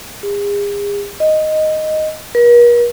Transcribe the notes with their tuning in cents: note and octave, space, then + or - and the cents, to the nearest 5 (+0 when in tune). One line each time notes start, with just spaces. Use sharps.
G#4 -40
D#5 +0
A#4 +45